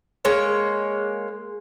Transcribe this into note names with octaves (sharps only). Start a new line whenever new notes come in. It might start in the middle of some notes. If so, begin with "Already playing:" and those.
G#3 A#3 C#5